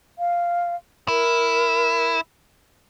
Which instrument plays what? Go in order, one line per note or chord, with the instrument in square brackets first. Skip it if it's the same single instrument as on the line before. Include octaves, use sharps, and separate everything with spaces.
[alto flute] F5
[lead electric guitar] E4 [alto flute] A#4